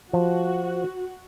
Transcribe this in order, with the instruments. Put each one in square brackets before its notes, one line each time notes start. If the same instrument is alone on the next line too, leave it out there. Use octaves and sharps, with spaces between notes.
[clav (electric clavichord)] F3 [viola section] F#4